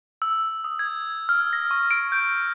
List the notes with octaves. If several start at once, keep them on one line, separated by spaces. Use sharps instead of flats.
E6
D#6
G#6
F6
A#6
C#6
D7
G6